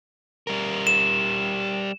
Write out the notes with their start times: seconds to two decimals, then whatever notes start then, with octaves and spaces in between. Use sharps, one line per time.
0.47 G3 A#4
0.87 E7